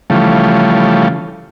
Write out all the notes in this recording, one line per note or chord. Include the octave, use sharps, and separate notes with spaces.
C#3 E3 F3 G3 A3